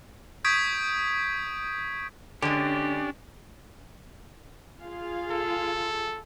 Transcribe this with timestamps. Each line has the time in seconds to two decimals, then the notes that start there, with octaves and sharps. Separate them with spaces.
0.44 C#6 D#6 G6 G#6 B6 D7
2.42 D3 G#3 C#4 D4 G4
4.81 F4 G#4 F5
5.31 A4